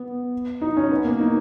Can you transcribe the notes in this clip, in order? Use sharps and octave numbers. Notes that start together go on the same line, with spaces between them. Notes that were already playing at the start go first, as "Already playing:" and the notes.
Already playing: B3
D#4
C#4
B3
A#3
D#4